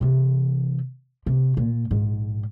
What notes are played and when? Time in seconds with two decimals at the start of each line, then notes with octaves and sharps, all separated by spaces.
0.01 C3 E3
1.26 C3
1.57 A#2
1.91 A#1 G#2